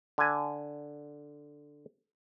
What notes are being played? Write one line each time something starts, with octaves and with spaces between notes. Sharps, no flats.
D3 G#5